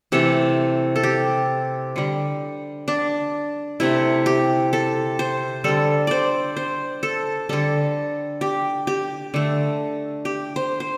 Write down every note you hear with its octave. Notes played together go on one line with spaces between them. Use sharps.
C3 E3 A3 A4
A4
G4
D3 G3
D4
C3 A3 E4
G4
A4
C5
D3 G3 A4
C5 D5
C5
A4
D3 G3 A4
G4
G4
D3 A3
G4
C5
C5